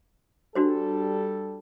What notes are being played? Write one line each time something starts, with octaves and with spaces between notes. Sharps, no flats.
G3 D4 F#4 A4 C5